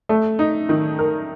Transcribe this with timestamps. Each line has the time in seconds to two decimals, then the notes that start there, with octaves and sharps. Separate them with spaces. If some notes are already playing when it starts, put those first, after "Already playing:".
0.09 A3
0.39 D#4
0.69 D#3
0.99 A#4